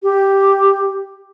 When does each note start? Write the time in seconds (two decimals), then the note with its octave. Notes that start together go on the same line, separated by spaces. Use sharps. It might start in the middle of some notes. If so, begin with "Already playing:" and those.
0.03 G4